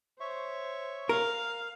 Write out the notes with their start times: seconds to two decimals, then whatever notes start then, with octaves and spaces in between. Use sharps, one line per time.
0.20 C5 C#5 E5 C#6
1.09 A#4 F5